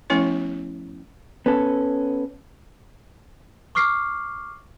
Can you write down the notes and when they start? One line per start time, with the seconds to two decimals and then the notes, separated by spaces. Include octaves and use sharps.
0.10 F3 A3 B3 C#4 E4 C#5
1.46 B3 C#4 A4
3.75 C#6 D6 F6 C7